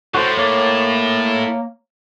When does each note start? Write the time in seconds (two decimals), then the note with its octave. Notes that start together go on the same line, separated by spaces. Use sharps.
0.14 A2 F#4 C5
0.37 A#3 C#5 D6